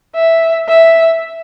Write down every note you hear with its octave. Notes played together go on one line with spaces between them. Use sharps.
E5
E5